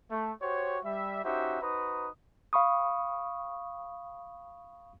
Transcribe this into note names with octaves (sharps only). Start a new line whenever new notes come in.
A3
F#4 G4 C5 C#5
G3 E5
C#4 D#4 F#4 G4 C5 E5
D#4 F#4 B4 C5 A#5 D#6
F5 B5 C#6 D#6